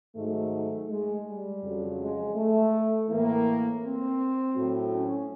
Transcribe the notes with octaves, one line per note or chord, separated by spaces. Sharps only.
G#2 D#3 F#3 A3
G#3
G3
F2 C#3 F#3
G#3
A3
A2 E3 A#3
C4
A2 F#3
C#4